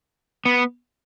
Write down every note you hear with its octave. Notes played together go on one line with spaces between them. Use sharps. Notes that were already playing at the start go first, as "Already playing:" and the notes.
B3